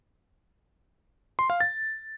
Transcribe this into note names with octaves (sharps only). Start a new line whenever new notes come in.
C6
F5
A6